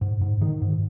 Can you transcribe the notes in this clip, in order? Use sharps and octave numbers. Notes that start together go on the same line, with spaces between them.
G#2
G#2
D#3
G#2